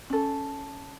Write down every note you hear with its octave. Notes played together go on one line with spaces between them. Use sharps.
C#4 A4